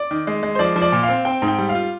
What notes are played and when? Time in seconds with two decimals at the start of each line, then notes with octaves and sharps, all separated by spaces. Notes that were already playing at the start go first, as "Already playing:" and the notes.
Already playing: D5
0.11 D#3
0.27 G#3
0.43 G#3
0.55 C5
0.59 F3 D5
0.76 F3
0.82 D5
0.92 A#2
1.03 F5
1.09 C4
1.25 C4 G5
1.42 G#2
1.48 G5
1.58 G3
1.69 F5
1.75 F4